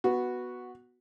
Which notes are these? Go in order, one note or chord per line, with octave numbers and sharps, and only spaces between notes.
B3 F#4